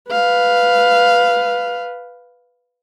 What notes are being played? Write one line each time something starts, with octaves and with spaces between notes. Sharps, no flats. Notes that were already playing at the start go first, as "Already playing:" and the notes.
B4 F5